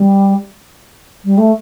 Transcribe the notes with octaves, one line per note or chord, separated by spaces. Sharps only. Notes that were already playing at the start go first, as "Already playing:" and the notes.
Already playing: G3
G3
A3